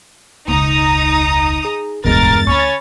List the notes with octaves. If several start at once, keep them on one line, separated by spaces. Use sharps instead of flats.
E1 C#2 D#4 A#5 D#6
G#4
D1 B1 E2 G2 G#3 A#4 A6
D2 D3 C#4 C#5 B5 C#6